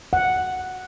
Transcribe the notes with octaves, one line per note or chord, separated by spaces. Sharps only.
F#5